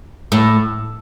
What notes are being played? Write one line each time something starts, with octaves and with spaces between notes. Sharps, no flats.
A2